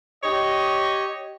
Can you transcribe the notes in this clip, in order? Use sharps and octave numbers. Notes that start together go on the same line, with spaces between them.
G4 C#5 D#5